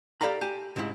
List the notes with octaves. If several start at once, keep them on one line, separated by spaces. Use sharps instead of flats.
G4 A4 D5 F5 A#5 B5
G4 G#5 A5
C#2 G#2 C3 G#3 E4